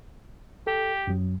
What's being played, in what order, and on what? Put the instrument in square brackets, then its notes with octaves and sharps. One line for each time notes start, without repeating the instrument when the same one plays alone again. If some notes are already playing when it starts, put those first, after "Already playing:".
[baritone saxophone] G4 [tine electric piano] A4
[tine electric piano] F#2 F#3